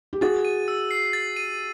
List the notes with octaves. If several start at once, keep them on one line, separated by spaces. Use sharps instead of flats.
G4
F#4 G#4 A6
D#7
E6
C7
A6
D#7